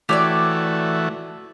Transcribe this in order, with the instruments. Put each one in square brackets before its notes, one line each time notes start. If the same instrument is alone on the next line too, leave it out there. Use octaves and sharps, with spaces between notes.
[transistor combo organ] E3 A3 F#4 [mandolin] G4 C#5 D5